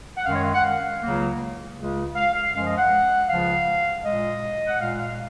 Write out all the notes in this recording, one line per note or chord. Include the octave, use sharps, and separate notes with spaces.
F#5
F#2 D#3 G#3 F5
C#5
F5
F#5
F5
C#2 C#3 F#3 A#3
C#2 C#3 G#3
F5
F5
F#2 F3 G#3 F5
D#5
F#5
C#2 C#3 F3 F5
A#2 G#3 D#5
F#5
A#2 G#3 F5
F5